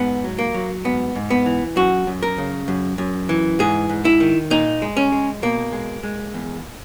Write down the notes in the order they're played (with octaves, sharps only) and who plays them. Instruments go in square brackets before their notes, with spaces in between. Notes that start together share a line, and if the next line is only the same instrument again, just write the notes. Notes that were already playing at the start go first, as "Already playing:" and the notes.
Already playing: [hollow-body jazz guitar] G#2 B3
F#3
A#3
F#3
G#2 B3
G#2
B3
E3
F#2 F#4
F#2
A#4
C#3
F#2
F#2
E3
G#2 G#4
G#2
E4
D#3
A#2 D#4
G#3
C#4
G#3
B2 A#3
G#3
G#3
E2